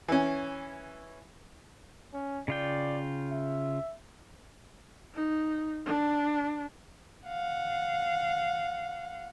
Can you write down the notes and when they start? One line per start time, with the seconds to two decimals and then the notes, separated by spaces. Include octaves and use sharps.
0.08 E3 C#4
2.13 C#4
2.48 C#3 F4 D5 G5
3.31 E5
5.15 D#4
5.86 D4
7.27 F5 F#5